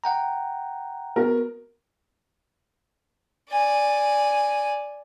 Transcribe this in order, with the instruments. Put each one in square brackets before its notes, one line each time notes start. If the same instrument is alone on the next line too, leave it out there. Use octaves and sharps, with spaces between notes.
[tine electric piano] F#5 G5 A#5
[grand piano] B3 F#4 A#4
[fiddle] D5 G#5